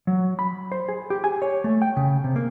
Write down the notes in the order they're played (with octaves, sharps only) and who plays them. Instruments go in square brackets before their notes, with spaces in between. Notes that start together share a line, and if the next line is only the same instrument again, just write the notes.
[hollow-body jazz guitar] F#3
B5
C5
G#4
G4
G#5
C#5
A3
G5
C#3
C3
A#3